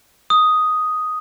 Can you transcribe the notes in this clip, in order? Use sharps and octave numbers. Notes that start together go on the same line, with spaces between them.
D#6